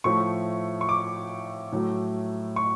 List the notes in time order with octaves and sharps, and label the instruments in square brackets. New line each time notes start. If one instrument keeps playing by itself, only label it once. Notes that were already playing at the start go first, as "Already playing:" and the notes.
[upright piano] A2 F3 A3 C#6
C#6
D6
A2 F#3 A3
C#6